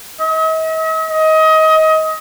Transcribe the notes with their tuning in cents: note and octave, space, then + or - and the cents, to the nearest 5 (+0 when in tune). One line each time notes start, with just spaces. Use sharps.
D#5 +45
D#5 +25